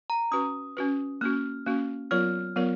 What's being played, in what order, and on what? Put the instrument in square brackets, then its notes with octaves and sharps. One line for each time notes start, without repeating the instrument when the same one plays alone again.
[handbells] A#5
[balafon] C#4 F#4 B4 [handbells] D#6
[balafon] C#4 F#4 B4
[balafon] A#3 C#4 F#4 [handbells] F6
[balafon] A#3 C#4 F#4
[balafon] F#3 B3 F4 A#4 C#5 [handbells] F6
[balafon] F#3 B3 F4 A#4 C#5